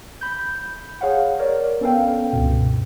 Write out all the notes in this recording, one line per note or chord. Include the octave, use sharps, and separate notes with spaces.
B5 G6
G#4 C#5 F5 F#5
A#4 C#5 D5
B3 C#4 A4 B4 F5 G5
C#2 G2 B2